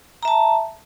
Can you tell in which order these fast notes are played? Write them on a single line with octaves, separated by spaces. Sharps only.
A#5 E5 A5